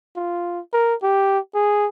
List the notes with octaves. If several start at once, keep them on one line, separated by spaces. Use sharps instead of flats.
F4
A#4
G4
G#4